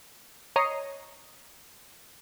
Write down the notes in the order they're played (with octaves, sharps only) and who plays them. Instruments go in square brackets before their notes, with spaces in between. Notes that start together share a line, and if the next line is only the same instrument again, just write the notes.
[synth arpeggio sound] C#5 D#5 A#5 D#6 C7 C#7